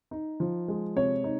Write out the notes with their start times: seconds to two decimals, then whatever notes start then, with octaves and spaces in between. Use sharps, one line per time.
0.11 D#4
0.40 F3
0.68 G#3
0.96 C3 C#5
1.24 D#4